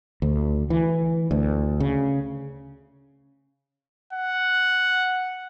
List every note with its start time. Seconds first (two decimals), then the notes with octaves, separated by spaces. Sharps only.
0.22 D2
0.70 E3
1.31 D2
1.80 C#3
4.13 F#5